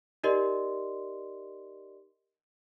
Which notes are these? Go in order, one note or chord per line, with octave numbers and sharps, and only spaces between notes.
D#4 G4 A#4 D5 D#5 C6